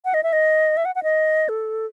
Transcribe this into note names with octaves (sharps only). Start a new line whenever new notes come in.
F#5
D#5
E5
D#5
E5
F#5
F#5
D#5
A4